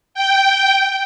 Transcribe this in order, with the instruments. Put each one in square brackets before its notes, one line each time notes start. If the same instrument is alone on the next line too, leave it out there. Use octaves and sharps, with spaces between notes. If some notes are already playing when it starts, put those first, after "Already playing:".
[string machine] G5